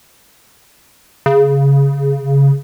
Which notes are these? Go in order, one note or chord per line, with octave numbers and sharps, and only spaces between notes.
C#3